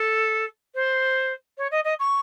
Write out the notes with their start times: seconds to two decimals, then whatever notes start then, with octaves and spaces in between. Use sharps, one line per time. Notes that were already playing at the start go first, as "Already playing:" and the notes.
Already playing: A4
0.74 C5
1.57 C#5
1.71 D#5
1.84 D#5
1.99 C#6